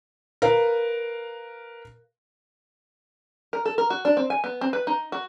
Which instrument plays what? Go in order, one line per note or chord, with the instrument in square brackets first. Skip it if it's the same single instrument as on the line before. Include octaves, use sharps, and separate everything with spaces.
[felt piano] A#4 B4 F5
[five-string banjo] A#4
A4
A#4
F#4
D4
C4
G#5
B3
C4
B4
D#4
F#4